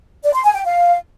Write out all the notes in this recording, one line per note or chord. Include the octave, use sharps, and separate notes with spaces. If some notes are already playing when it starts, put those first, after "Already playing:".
D5
C6
G#5
G5
F5